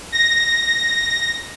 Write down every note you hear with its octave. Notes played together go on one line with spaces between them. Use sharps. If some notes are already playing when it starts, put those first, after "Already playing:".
A#6